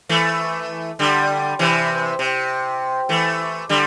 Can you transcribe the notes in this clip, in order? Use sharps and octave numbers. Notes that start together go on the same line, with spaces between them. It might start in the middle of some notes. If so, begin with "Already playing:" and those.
E3 A3
D3 G3
C3 E3
C3
E3 A3
D3 G3